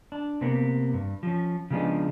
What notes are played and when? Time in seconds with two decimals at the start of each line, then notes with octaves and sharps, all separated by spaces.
0.12 D4
0.41 C3 A#3 B3
0.93 G2
1.23 F3 C#4
1.70 C#3 F3 G#3 B3 D4 D#4